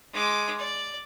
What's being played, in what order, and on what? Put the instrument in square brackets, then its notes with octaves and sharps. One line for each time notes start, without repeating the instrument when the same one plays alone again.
[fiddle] G#3 D6
D5